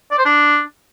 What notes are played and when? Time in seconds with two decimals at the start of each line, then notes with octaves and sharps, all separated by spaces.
0.11 D5
0.18 C5
0.25 D4